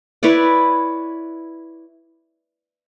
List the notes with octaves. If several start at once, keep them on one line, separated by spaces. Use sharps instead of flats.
E4 B4 C#5 D5